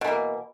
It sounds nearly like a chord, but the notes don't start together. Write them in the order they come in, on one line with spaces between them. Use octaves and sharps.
B2 E3 A#3